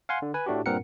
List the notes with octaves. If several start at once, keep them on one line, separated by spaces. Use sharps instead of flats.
F5 F#5 G#5 C6
D3
B4 G#5
A2 A3 D4 F#4 G4
G2 A#2 C4 A#4 F#5 C#7